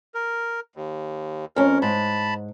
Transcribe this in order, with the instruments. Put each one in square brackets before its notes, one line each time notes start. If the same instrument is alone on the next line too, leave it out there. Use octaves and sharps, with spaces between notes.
[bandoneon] A#4
D#2
[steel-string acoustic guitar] F2 C#4 [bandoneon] A#4
[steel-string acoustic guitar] G#2 [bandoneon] A5 B5